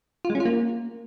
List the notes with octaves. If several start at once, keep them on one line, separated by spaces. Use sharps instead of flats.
F4
G#3
C#4
F4
A#3